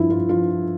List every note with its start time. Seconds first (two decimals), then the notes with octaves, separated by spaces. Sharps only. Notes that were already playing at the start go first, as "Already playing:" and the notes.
Already playing: G2 F3 E4
0.10 G2 F4
0.29 F3 F4